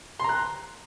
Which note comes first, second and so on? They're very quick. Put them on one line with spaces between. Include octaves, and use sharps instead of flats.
C6 A#5 F#6